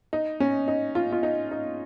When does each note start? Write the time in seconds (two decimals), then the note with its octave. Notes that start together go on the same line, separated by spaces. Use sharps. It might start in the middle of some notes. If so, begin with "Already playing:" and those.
0.13 D#4
0.40 C#4
0.68 D#4
0.95 F4
1.12 F4
1.23 D#4
1.51 D#4